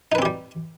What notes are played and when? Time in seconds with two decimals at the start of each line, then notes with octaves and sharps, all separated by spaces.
0.12 D#4
0.15 B4
0.19 C4
0.22 G4
0.25 G3